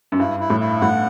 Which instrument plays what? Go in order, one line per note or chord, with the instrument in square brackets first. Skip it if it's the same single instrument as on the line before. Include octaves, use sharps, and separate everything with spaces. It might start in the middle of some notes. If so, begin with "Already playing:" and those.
[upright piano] F#2
[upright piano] G2 [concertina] E4
[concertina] E4
[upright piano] A2
[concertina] E4
[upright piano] A2 [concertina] F#5